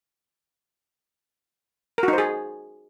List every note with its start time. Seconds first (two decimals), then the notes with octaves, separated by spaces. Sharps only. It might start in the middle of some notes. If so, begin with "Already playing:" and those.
1.98 A#4
2.03 F#4
2.08 D#4
2.13 C5
2.18 G#4